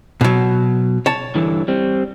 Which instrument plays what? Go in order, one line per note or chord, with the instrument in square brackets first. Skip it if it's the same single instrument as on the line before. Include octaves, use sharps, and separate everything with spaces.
[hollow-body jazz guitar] B2 F#3
C#5 A5
[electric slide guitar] G2 D3 E3
G3 C4